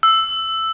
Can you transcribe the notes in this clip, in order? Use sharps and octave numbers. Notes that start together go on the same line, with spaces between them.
E6